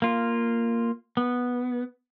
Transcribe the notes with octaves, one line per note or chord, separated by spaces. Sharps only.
A#3 F4
B3